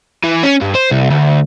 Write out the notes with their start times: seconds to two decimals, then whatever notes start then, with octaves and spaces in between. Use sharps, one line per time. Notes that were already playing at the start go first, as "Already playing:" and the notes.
0.24 E3
0.44 C#4
0.62 G2
0.75 C5
0.91 C2
1.10 D2